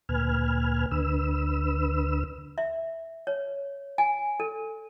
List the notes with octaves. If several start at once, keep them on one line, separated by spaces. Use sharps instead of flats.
D2 A#2 B4 G#5 F6
D2 D3 B4 E6
E5
C#5
G#5
A4